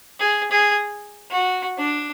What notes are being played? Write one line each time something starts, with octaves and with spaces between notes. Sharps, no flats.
G#4
G#4
F#4
D4